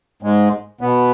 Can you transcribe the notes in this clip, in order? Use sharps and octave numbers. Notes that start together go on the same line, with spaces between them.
G#2 G#3
B2 B3